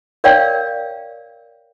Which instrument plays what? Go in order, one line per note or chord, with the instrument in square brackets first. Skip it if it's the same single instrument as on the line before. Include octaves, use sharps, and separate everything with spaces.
[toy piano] A#4 C#5 D5 F5 G5